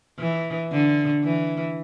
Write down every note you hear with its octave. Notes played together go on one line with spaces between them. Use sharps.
E3
D3
E3